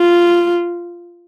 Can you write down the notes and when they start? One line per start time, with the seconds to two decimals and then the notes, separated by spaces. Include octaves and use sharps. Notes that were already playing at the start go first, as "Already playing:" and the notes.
Already playing: F4